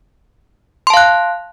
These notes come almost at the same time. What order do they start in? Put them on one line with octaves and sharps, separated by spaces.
C6 A5 F5 F#6